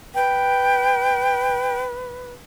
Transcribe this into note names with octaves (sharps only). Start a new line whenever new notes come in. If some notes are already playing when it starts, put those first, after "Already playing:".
B4 G5